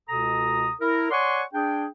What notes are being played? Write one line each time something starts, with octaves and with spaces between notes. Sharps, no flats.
C#2 B2 A4 A#5 D#6
E4 A#4
C#5 D5 F#5 G#5 C6 C#6
D4 G#4 G5